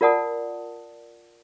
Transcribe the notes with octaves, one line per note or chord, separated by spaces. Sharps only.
F4 A#4 D5 F#5 A5 D#6